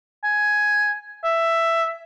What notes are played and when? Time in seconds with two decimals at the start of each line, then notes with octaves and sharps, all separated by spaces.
0.24 G#5
1.24 E5